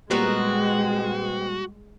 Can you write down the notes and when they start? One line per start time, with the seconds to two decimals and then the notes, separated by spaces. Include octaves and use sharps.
0.11 A#2 G3 G#3 B3 C4 F#4 A#4